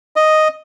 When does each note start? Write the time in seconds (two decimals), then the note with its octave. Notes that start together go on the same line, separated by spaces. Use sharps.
0.16 D#5